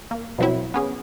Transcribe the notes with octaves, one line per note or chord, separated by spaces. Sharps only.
A#3
B2 F3 F#3 C4 E4
B3 C#4 G#4